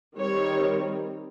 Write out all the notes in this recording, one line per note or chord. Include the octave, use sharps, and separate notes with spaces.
D#3 G3 C4 C#5